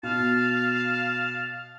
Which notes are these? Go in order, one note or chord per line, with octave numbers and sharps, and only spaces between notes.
B2 F5 A5